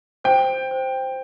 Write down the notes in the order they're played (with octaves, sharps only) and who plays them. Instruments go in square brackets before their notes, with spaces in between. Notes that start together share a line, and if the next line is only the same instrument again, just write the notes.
[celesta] C5 [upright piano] G5
[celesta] C5